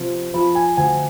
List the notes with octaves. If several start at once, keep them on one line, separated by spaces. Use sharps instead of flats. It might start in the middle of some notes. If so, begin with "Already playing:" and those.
Already playing: C3 F3 C5
F3 B5
G#5
D2 G#5